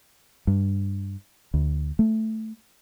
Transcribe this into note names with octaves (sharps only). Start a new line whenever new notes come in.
G2
D2
A3